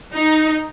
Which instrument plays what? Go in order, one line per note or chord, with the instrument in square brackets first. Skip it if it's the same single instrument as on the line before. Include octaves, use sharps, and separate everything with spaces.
[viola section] D#4